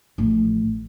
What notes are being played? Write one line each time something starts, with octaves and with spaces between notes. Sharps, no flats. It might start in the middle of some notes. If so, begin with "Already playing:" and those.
A1 F3